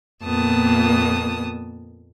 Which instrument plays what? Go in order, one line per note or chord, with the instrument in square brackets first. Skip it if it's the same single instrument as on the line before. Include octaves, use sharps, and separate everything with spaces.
[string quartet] F2 A#2 A#3 B3 A5 D#6